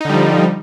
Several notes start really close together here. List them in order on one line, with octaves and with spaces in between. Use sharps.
D#4 D3 G3 F3